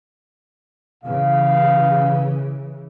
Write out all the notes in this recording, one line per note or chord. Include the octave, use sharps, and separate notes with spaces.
C#3 E3 F5